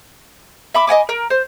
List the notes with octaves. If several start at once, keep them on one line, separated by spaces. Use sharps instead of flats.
E5 B5 D6
D#5 F#5 G#5 D6
A#4
C5